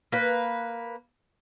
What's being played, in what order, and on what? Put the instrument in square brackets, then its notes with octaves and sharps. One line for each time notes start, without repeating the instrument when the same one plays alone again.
[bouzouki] A#3 B4